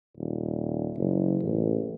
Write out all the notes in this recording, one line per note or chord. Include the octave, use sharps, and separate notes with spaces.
D#1
F#1
A1